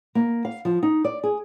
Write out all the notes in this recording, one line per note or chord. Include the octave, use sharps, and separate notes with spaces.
A#3
F5
F3
D#4
D5
G#4